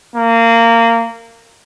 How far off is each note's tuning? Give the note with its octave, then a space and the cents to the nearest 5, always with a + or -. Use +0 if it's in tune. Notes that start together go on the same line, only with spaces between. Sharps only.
A#3 -20